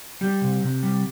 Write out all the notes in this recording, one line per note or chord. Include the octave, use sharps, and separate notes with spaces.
G3 G4
C3
C3
G3